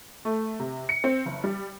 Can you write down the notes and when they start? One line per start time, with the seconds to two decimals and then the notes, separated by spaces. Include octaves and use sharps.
0.25 A3
0.60 C3
0.89 C#7
1.04 C4
1.26 F#1
1.44 G3